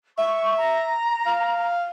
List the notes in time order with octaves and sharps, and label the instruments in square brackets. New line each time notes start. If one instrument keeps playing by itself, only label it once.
[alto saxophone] E5 [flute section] C#6
[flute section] A#5
[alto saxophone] F5